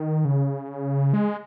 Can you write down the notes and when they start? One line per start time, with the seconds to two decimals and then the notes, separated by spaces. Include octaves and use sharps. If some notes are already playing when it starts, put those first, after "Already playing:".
Already playing: D#3
0.25 C#3
1.13 G#3